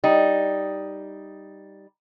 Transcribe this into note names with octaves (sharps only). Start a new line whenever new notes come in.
G3 D#4